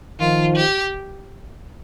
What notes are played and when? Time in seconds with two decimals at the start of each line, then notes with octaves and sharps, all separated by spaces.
0.20 D#3 F3 F4
0.56 G4